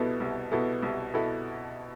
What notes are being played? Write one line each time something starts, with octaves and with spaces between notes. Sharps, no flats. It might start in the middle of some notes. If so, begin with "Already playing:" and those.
Already playing: C2 B2 B3 E4 A4
C2
B2 B3 E4 A4
C2
B2 B3 E4 A4